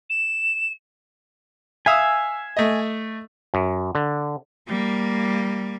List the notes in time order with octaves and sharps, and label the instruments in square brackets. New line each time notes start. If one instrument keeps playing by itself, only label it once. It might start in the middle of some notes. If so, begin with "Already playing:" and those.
[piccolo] E7
[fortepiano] E5 F5 D#6 [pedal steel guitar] G#5 E6
[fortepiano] A3 D#5
[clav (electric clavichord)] F#2
D3
[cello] G3 A#3